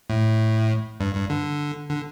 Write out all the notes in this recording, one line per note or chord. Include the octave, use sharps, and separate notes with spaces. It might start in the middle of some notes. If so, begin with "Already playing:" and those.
A2
G2
G2
D3
D3